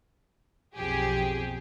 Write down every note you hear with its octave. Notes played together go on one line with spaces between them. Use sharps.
B1 F2 G4 G#4